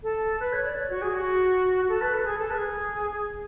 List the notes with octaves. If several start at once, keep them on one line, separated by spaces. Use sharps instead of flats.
A4
B4
C#5
D5
C#5
F#4
G#4
F#4
A4
B4
A4
G#4
A4
B4
G#4